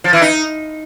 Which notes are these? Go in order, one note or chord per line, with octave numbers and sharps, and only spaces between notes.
F3
E3
D#4